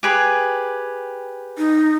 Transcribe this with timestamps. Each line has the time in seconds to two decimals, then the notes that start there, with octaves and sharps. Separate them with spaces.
0.03 G4 G#4 B4
1.58 D#4